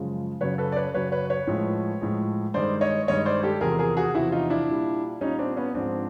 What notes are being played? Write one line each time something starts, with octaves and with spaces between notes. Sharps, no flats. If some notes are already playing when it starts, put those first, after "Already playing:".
Already playing: F#2 C#3 F3 G#3
F#2 C#3 F#3 B4 C#5
A4 B4
D5
B4 C#5
F#2 C#3 F#3 B4 C#5
B4 C#5
B4 C#5
A2 F3 G#3
A2 F3 G#3
G2 D#3 G#3 C5 D5
C#5 D#5
G2 D#3 G#3 C#5 D#5
C5 D5
G4 A4
E2 C3 F3 G#4 A#4
G#4 A#4
F#4 G#4
E2 C3 F3 E4 F#4
D#4 F4
D4 E4
A#2 G3
A#2 G3 C#4 D#4
C4 D4
B3 C#4
G#2 F3 G#3 C4 D4